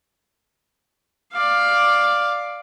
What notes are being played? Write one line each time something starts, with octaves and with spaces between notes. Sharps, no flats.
D5 F5